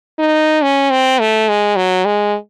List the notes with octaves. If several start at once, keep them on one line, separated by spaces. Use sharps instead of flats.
D#4
C#4
C4
A3
G#3
F#3
G#3